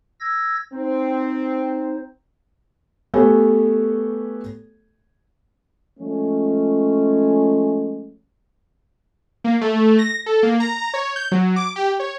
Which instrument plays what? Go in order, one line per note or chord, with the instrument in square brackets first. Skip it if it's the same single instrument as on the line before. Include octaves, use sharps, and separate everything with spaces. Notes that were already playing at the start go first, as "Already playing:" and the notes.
[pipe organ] E6 G#6 A#6
[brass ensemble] C4 [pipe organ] D#4 C5
[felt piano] A3 B3 G4 A4 C#5 G#5
[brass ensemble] F3 G#3 A3 C#4
[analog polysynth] A#3
A3
A#6
A4
A#3
A#5
C#5
G6
F#3
D6
G4
C#5